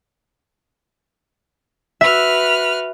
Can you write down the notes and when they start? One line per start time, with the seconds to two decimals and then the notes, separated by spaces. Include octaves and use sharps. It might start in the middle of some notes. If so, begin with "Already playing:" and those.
2.01 F#4 B4 E5 F6